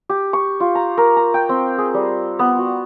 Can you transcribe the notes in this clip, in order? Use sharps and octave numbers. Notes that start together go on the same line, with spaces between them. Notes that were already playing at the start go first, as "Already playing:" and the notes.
G4
C#6
F4
A#5
A#4
A#5
G5
C4
G#4
G3
B3
F#4